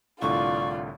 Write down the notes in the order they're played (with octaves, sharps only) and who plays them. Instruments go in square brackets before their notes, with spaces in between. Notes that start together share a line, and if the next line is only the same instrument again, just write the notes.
[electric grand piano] C2 A2 D3 [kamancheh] F4 D5 [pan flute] C#6